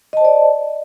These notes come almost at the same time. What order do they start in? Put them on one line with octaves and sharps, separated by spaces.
D#5 A5 C5 D5